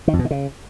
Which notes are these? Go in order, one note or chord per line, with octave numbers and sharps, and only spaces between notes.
D#3
F2
B2
D#3
C#3